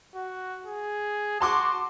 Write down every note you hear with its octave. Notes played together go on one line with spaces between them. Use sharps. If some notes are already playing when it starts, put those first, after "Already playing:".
F#4
G#4
F#4 A5 C6 D6